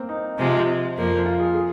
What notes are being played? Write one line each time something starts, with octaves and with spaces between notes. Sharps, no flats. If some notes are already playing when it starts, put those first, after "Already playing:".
Already playing: A#3 C4
D#4
C3 F3 G#3
F2 F3 A#3
F4
G#4
G#4